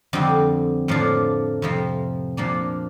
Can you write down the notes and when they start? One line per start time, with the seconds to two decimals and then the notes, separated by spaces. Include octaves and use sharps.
0.13 F2 D3 G3 C4
0.88 A2 F3 A#3 D4
1.62 F2 C3 F3
2.37 A#2 F3 A#3 D4